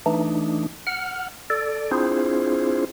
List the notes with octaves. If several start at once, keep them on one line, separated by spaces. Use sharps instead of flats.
E3 A3 D4 D#4
F#5 F6
A4 D5
C4 D4 E4 F4 G#4 C5